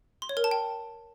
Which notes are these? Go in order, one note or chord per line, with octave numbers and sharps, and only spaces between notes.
C6
C#5
A#4
A5
G5